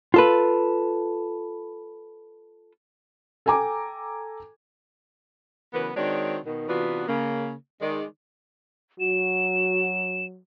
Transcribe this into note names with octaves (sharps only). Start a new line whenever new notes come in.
F4 A4 B4
A4 G5 G#5 A#5 D6
C#3 E3 F#3 B3 A#4 B4
D#3 G#3 C4 D4 F#4 C#5
B2 D#3
C3 E3 B3 D4 F4 F#4
C#3 A#3
D#3 G#3 D5
F#3 F#4 E7